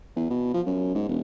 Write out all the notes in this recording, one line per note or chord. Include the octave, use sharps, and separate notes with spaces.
E2
B2
F3
F#2
G#2
E1